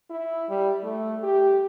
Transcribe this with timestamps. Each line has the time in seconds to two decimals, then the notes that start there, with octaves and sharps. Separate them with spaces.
0.10 E4
0.50 G3
0.83 A3
1.23 G4